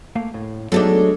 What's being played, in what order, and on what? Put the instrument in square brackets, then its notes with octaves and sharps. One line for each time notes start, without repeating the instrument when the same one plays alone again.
[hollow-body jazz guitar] A3 A#3 F5
A2
[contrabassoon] F#3 [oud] G#3 A3 D4 [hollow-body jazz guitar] B3 D#4 [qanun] A4